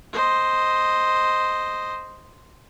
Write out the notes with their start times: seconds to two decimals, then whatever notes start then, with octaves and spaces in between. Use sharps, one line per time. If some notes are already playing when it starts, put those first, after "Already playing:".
0.13 C5 D#5